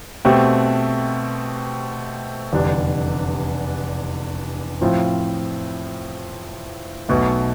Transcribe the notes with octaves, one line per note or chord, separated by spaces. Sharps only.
B2 A3 C4 G4
F1 E2 D3 G3 D4
A2 F3 C4 F4
B1 B2 A3